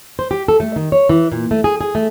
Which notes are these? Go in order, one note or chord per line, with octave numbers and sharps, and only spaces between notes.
C5
G4
A4
A3
D#3
C#5
E3
A#2
A3
G#4
G#4
A3